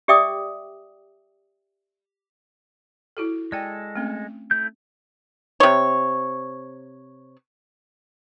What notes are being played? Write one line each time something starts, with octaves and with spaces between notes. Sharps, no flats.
G4 D5 E5 G5 D6 D#6
E4 F#4 A4
G#3 A4 D5 G5
A3 C4 C#4
A3 E4 G6
C3 C#5